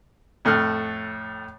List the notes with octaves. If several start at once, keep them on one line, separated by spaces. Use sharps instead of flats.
F2 A2 A4 F6 F#6